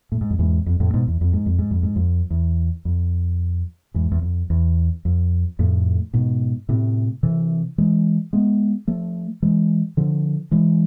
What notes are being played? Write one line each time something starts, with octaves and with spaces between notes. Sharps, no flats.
A2
G#2
F2
E2 G#2
F2
F2 A2
G#2 B2
E2
F2
G#2
F2
G#2
F2
G#2
F2
E2
F2
E2 G#2
E2
F2
E2
F2
F2 A2
G#2 B2
A2 C3
C3 E3
E3 G#3
G#3 B3
F3 A3
E3 G#3
D3 F3
E3 G#3